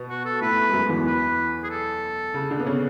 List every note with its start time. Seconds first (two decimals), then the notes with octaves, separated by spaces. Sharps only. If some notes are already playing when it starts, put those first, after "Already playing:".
Already playing: B2 B3
0.10 F#4
0.25 A4
0.41 A2 A3 B4
0.69 G#3
0.73 F#2 F#3
0.89 E2 E3
1.06 B4
1.64 G#4
1.70 A4
2.34 C#3
2.51 D3
2.60 B3
2.66 C#3 C#4